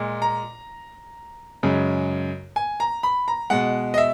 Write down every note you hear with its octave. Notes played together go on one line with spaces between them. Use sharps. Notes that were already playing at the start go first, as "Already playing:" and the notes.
Already playing: A#2 G#3
A#5
F#2 C#3 G#3
G#5
A#5
B5
A#5
B2 G#3 F#5
D#5
E5